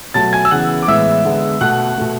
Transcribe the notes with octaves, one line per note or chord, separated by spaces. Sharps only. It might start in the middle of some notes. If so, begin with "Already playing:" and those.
B2 F#3 A3 A5 A6
G#5 G#6
E6
C#3 E3 B3 F#5 F#6
D6
A2 E3 G#3 B3 E5 E6
D3 G#3 B3
B2 A3 F#5 F#6
B2 A3